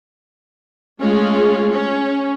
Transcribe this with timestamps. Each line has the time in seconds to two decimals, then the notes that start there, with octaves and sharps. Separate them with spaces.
0.99 G#3 A3 C#4 F4 G#4
1.70 C#4